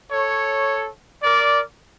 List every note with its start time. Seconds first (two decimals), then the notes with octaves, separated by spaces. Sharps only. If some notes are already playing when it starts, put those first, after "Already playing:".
0.12 A4 C#5
1.23 A#4 D5